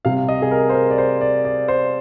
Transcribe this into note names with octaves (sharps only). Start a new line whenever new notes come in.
C3 G3 F5
D#5
G#4
A#4
C5
A#4
D5
C5
D5
D5
C5